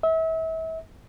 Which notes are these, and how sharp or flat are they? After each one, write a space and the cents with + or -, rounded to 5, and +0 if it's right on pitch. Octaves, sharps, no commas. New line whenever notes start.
E5 -35